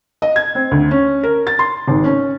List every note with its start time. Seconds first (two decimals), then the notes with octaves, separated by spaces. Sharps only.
0.22 D#5
0.36 G#6
0.55 C4
0.71 D2
0.91 C#4
1.23 A#4
1.47 A6
1.59 C6
1.88 G#1
2.04 C#4